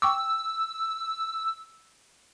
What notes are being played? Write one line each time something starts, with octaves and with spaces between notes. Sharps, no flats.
G5 C#6 D6 E6